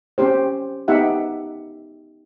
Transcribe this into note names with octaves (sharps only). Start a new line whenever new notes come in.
C4 C#4 G4 C5
B3 D#4 G4 E5 F#5